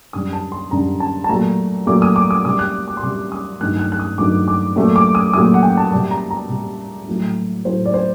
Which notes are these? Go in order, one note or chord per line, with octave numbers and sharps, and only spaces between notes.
F#2 D3 G3 D#6
A5
C6
F#2 D3 G3 A#5
A5
A5
A#2 F#3 A3 A#5
A#2 F#3 A3 D6
D#6
D6
D#6
C3 G3 D#6
F#6
D6
C6
C3 G3 D6
D#6
G2 D#3 F#3 A3 F#6
F#6
F#6
D#6
G2 D#3 F#3 A3 D6
D6
A#2 F#3 A3
D6
D#6
A#2 F#3 A3 D#6
F#5
G5
A5
C3 G3 A5
A#5
A#5
C3 G3
A2 F#3 A3
A2 F#3 A3 C5
D5
C5